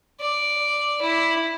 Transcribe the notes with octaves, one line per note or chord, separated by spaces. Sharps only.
D5
E4